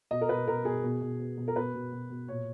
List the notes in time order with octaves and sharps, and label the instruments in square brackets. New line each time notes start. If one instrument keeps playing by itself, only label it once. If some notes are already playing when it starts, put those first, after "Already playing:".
[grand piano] B2 D#5
A#4
B2 B4
B2 A#4
B2 G#4
B2
B2
B2
B2
A#4
B2 B4
B2
B2
B2
A#2 C#5